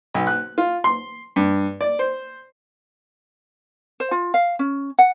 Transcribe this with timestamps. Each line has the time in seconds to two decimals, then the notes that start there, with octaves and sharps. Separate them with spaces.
0.14 B1
0.27 F#6
0.58 F4
0.84 C6
1.36 G2
1.81 D5
1.99 C5
4.00 C5
4.11 F4
4.34 F5
4.59 C#4
4.99 F#5